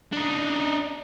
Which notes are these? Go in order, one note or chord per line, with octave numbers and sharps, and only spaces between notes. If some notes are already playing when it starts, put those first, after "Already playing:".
D4 D#4